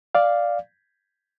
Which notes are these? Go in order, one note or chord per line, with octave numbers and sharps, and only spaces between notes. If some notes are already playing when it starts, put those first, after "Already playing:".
D5 F5